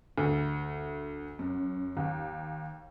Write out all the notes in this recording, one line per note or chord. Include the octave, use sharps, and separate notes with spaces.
D2
F#2
D#2